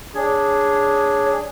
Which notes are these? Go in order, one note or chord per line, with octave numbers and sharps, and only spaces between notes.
D4 G#4 C#5